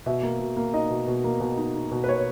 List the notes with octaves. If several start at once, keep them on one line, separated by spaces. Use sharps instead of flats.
B2 E5
A#3
B2
A#3
D#4 D#5
B2
B2
A#3
B2
D#4
D#4
B2
B4
A#3 C#5